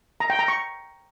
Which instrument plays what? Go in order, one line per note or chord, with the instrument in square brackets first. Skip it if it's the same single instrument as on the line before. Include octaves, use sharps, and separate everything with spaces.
[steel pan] A#5
G5
A#5
C#6